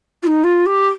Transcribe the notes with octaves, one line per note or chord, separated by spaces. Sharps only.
F4
D#4
F4
G4